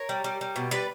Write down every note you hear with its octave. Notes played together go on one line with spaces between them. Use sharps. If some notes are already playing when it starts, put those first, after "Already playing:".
Already playing: A#4 C#5
G3
G3
G3
B2
G3 B4 D5